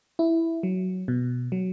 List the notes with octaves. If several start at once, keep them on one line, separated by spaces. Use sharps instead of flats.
E4
F#3
B2
F#3